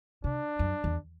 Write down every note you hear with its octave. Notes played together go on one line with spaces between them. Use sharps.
C3 D4
F#2
E2